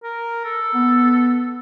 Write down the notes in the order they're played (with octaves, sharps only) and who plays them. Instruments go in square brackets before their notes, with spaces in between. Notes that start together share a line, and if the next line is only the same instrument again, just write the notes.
[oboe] A#4
A4
[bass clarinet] B3